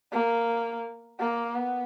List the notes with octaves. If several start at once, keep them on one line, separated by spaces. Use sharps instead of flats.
A#3
A#3
B3